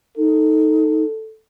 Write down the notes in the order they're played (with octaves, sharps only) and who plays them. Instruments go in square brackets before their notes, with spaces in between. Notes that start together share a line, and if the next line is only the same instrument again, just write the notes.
[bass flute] D#4 [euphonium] A4